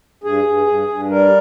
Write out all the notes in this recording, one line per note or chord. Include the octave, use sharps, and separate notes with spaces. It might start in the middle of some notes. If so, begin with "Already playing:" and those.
G2 G#4
G2
G2
G2
G3 A#4